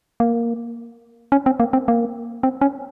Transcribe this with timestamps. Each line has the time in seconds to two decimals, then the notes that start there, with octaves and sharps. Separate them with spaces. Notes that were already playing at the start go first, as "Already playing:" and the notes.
0.20 A#3
1.32 C#4
1.46 C4
1.60 A#3
1.73 C4
1.88 A#3
2.43 C4
2.61 C#4